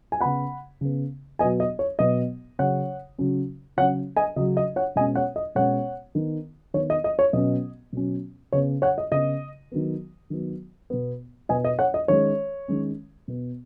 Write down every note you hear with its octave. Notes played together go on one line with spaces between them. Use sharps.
G#5
C#3 B3 F#5 B5
C#3 B3
B2 F#3 B3 D#5 G#5
D#5
C#5
B2 F#3 B3 D#5
C#3 F#3 C#4 C#5 F#5
C#3 F#3 C#4
C#3 F#3 C#4 C#5 F#5
D#5 G#5
C#3 F#3 C#4 D#5
D#5
C#5 F#5
B2 G#3 C#4 D#5 G#5
C#5 F#5
D#5
B2 G#3 C#4 C#5 F#5
D#3 B3
D#3 B3 C#5
D#5
D#5
C#5
B2 F#3 C#4 D#5
B2 F#3 C#4
C#3 B3 C#5
C#5 F#5
D#5
C#3 B3 D#5
D#3 F#3 B3
D#3 F#3 B3
B2 B3
B2 B3 D#5 G#5
D#5
C#5 F#5
D#5
D#3 G#3 C#4 C#5
D#3 G#3 C#4
B2 B3